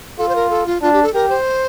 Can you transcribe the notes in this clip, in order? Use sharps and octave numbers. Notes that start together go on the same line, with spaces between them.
F4 A4
C5
A#4
A4
F4
D4 F4
G4
A4
G4 A#4
C5